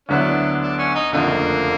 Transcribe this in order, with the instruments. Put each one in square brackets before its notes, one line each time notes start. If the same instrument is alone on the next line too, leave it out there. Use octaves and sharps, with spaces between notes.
[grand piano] D2 D3 F#3 B3 E4 [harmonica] D4
[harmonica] D4
C#4
D#4
[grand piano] F#1 F2 D3 F3 A3 [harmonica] A#3